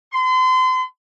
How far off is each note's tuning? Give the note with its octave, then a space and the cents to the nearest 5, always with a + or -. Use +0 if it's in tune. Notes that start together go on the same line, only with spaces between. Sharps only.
C6 -35